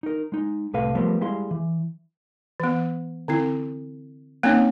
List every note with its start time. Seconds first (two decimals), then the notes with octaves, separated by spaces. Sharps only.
0.03 D#4 A#4
0.32 G#3 D#4
0.73 C2 A2 C3 A4 B4 F5
0.95 F3 G3 A3 B3 A#4 C5
1.21 G3 G#3 E4 G#4 F5 C6
1.51 E3
2.60 E3 B3
3.28 D3 C4 E4
4.43 A#3 C4 C#4 D#4 C#5